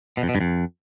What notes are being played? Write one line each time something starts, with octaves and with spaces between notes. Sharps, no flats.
B2
F2
B2
G2
F2